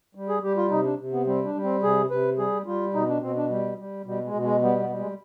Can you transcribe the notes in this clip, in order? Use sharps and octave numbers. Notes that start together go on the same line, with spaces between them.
G3
G#4
G3 G4
F4
C3 D#4
D4
C3
B3
G3 C4
D4
G3
C4
C3 G#4
C3 B4
G3 G#4
G3 F4
B2 D#4
D4
B2 C4
D4
G3
G3
B2 G3
G#3
B2
G#3
G3 B3
B3
G3
G#3